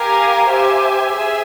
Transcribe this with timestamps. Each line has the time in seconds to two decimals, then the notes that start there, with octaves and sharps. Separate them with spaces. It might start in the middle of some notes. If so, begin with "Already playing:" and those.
Already playing: G4 A#4 F5 G#5
0.49 G4 C5 E5 G#5
1.11 G#4 E5 G#5